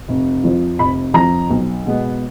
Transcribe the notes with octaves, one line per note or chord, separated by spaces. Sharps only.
F1
F2 F3
F1 B5
F2 F3 A#5
B1
B2 G#3 B3